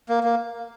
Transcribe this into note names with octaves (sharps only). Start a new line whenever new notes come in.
A#3
A#3